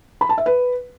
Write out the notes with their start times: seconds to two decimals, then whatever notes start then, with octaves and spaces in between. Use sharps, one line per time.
0.21 B5
0.29 A5
0.38 E5
0.46 B4